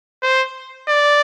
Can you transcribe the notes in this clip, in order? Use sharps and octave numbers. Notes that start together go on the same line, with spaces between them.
C5
D5